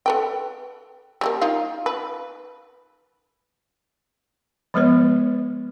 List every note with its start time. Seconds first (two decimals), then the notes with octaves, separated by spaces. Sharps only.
0.06 A4 B4 G5
1.21 G3 A3 A#3
1.41 D#4 F4 F5
1.86 B4
4.74 F3 G#3 B3 B4 C#5